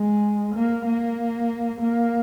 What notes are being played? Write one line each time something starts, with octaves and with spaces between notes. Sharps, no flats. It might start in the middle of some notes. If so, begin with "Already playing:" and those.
Already playing: G#3
A#3
A#3
A#3